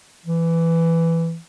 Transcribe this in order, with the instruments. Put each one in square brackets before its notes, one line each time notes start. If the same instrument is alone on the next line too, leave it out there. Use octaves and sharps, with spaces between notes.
[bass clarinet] E3